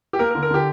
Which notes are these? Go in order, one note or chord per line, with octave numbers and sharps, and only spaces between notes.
G4
A#3 A#4
A#4
D3
A#4
D3 G4